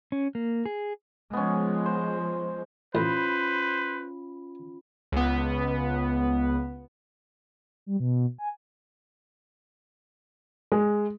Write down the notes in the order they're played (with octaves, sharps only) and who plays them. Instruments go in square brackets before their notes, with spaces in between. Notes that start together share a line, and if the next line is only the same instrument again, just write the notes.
[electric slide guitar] C#4
A#3
G#4
[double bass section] F3 G#3 [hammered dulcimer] B3 C#4
[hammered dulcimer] C5
[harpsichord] A1 [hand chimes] C#4 F4 B5 [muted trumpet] B4 [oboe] C5
[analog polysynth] C#2 B3
[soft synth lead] G3
B2
G#5
[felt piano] G#3